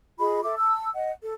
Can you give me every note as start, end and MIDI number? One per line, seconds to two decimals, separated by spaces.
0.19 0.42 65
0.19 0.42 68
0.19 0.42 75
0.19 0.42 83
0.43 0.55 69
0.43 0.55 76
0.43 0.55 86
0.57 0.89 81
0.57 0.89 88
0.94 1.11 75
0.94 1.11 78
1.22 1.33 69